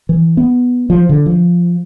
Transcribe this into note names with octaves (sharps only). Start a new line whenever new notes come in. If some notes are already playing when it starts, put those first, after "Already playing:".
E3
B3
F3
D3
F3